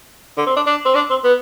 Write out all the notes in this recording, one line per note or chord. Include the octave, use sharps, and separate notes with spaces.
D3
C4
D4
D4
C4
D4
C4
B3